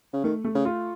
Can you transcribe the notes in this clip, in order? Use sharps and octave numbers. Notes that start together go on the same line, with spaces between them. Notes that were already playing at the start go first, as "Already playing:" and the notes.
C#3
D#3 A3
A3
C#3
F4